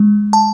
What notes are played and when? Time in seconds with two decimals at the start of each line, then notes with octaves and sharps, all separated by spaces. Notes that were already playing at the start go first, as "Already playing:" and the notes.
Already playing: G#3
0.33 A5